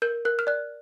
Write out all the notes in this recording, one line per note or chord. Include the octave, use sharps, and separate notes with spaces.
A#4 G6
A#4 F#6
F6
D5 F#6